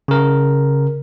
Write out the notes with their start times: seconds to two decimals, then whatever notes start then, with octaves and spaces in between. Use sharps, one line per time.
0.08 C#3 A#4